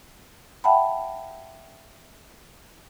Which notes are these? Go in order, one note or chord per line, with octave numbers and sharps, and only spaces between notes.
E5 F#5 G5 A5 B5